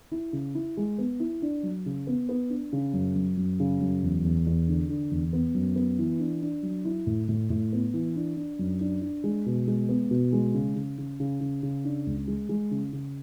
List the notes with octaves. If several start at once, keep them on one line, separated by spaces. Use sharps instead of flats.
E4
C#3
E4
G#3
B3
E4
D4
F#3
C#3
B3
B3
D4
C#3
F#2
F#2
F#2
C#3
F#2
E2
E2
E2
D3
D3
E2
B3
F#2
B3
E3
D4
D4
F#3
E4
A2
A2
A2
B3
E3
D4
D4
F#2
D4
D4
G#3
B2
G#3
B3
B2
G#3
C#3
C#3
C#3
C#3
C#3
C#3
D4
C#2
G#3
G#3
C#3
C#3